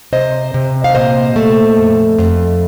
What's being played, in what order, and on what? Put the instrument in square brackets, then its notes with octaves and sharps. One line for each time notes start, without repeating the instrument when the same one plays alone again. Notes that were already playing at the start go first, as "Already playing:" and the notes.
[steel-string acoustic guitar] C3 C5 D#5
C3
F5
A#2 C5 D#5
A3
F2
F2